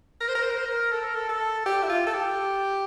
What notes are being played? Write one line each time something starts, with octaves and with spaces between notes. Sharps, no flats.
A#4
C5
A#4
C5
A#4
C5
A#4
A4
A#4
A4
A4
G4
E4
F4
A4
G4